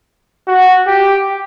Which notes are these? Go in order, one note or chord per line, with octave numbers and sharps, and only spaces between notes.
F#4
G4